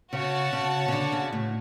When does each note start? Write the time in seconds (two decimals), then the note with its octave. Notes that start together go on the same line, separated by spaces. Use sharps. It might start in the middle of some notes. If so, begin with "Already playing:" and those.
0.13 C#3 F#4 C#5 F#5 A5
0.53 C#3
0.88 C#3
0.92 D3
1.12 C#3
1.33 A2